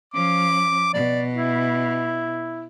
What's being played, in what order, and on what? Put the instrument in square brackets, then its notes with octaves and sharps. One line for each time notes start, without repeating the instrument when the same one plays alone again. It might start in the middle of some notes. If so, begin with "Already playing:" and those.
[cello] F3 C#4 [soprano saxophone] D6
[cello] B2 [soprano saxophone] D5
[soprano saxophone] E4